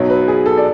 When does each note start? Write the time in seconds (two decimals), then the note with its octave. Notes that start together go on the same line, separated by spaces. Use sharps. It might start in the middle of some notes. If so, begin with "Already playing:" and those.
Already playing: B1 B2 F#3 C#5
0.10 B4
0.28 G#4
0.46 A4
0.57 D5